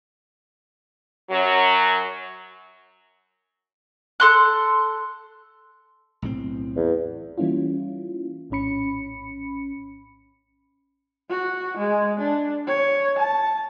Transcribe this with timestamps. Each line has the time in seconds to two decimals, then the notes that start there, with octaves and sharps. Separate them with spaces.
1.31 F#2 F#3
4.20 A4 C6 F#6
6.22 B1 A2 C4
6.76 E2
7.38 E3 G3 A#3 C#4 E4 F4
8.50 A#1 A2 C#4 B5 C#7
11.30 F#4
11.78 G#3
12.19 D4
12.67 C#5
13.18 A5